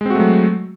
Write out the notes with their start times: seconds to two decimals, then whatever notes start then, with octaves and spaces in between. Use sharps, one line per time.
0.01 G#3
0.06 C4
0.10 F#4
0.15 A3
0.20 F#3